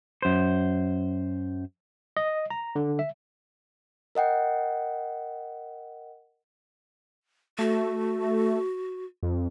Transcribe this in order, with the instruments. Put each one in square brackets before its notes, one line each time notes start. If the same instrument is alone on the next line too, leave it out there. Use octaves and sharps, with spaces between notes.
[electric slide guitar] F#2 C5
[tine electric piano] D#5
A#5
D3
E5
[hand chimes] A#4 D#5 F#5 G5
[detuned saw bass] A3 [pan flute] F#4
[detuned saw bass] F2